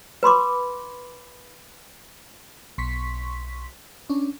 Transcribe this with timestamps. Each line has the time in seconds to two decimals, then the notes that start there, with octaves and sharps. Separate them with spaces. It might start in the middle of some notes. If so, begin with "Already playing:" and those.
0.23 B4 B5 C6 D6
2.78 B1 C6 C#6 B6
4.09 C#4 D4